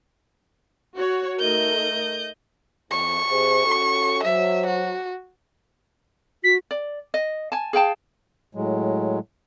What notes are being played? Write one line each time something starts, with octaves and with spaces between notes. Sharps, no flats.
F#4 C#5
A3 D#4 A#4 D#5 G6
F2 C#6
C3 G#4 C5
C#4 F#4 A4
F#3 C5 E5
F#4
F#4 B6
D5
D#5
G#5 A5
G#4 F5 G5 A5
A2 F#3 G#3